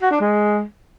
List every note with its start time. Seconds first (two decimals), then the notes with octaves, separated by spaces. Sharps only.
0.02 F#4
0.11 D4
0.20 G#3